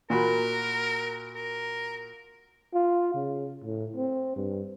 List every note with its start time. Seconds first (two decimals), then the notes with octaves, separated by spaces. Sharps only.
0.10 A#2 F#4 A#4 B5
1.35 A#4
2.74 F4
3.14 C#3
3.64 A2
3.96 C4
4.36 G2